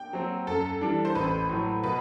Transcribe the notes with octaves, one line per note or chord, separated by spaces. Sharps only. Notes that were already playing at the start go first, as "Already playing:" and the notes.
Already playing: G5
F#3 C4
F#2 A4
E3 G3 D4
C5
A1 B4
A2 F#3
B2 B4